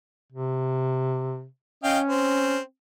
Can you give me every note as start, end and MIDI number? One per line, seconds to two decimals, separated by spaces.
0.32 1.46 48
1.84 2.58 61
1.84 1.99 75
1.84 1.99 77
1.84 1.99 79
2.07 2.59 60